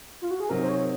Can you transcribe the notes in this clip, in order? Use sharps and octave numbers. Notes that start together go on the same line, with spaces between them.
F4
F#4
G#4
C3 F#3 C4 D#4 A#4
C5
C#5